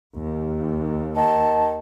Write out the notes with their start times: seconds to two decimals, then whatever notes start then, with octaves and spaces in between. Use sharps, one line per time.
0.15 D#2
1.16 D#3 A5